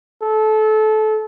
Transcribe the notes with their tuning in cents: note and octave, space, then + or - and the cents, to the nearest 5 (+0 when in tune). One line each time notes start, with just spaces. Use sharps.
A4 -25